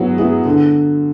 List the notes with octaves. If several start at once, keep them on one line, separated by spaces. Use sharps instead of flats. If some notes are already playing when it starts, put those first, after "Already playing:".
Already playing: F#3 B3 E4 G#4
B3 E4 G#4
D3